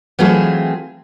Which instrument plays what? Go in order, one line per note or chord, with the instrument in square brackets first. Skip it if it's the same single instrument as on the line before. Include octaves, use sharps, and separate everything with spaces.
[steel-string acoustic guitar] E3 F#3 A3 C4 F4 G#4